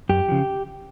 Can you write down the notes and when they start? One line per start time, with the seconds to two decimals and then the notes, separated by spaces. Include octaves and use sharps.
0.09 F#2 G4
0.29 C#3 F3